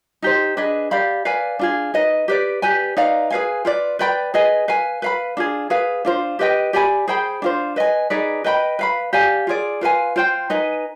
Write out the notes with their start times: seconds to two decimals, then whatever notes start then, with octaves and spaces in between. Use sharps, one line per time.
0.22 D#4 G4 C5
0.57 D4 G#4 B4 D#5
0.91 G4 D5 F5 B5
1.25 B4 D5 F5 G#5
1.59 D4 F4 G#4
1.94 D#4 B4 D#5
2.28 G4 B4 D5
2.62 G4 B4 D5 G#5
2.97 D#4 B4 D5 F5
3.30 G#4 B4 F5 G#5
3.65 F4 B4 D5
3.99 B4 D5 G5 B5
4.34 G#4 B4 D#5 G#5
4.68 B4 F5 G#5
5.02 B4 F5 B5
5.37 D4 F4 G#4
5.70 G#4 B4 F5
6.05 D4 F4 C5
6.39 G4 B4 D#5 G5
6.73 G4 D5 G#5 B5
7.08 G#4 C5 G5 B5
7.42 D4 F4 C5
7.76 B4 D#5 G#5
8.10 D#4 G#4 B4 D5
8.44 B4 D#5 G5 B5
8.79 B4 F5 B5
9.13 G4 D5 F5 G#5
9.47 F4 G#4 D5
9.81 F4 B4 F5 G#5
10.16 F4 C5 G5
10.50 D#4 B4 D#5 G#5